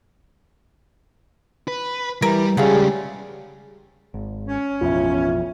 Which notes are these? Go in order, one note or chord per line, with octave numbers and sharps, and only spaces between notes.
B4
E3 G3 A#4
C#2 G3 A3 C#4 G#4 F5 F#5
G#1
C#4
A1 F2 B2 F4 E5